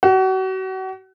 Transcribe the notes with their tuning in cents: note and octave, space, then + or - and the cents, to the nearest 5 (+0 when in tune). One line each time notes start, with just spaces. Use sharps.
F#4 +35